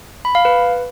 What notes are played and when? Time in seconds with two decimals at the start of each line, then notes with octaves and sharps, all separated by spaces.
0.25 B5
0.35 F5
0.45 B4